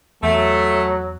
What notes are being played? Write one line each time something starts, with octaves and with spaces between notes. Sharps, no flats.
E2 F#3 A3